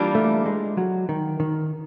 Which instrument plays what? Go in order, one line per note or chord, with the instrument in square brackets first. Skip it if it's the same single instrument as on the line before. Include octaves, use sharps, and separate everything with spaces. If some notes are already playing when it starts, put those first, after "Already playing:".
Already playing: [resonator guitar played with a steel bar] E3 G3 A#3 D4 F4
[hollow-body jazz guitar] A3
G#3
F#3
D#3
D#3